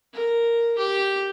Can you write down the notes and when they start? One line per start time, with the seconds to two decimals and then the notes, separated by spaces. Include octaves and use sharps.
0.14 A#4
0.78 G4